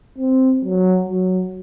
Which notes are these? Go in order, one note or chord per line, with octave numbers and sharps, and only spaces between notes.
C4
F#3
F#3